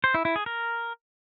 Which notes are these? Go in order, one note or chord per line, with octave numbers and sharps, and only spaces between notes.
C5
E4
E4
G#4
A#4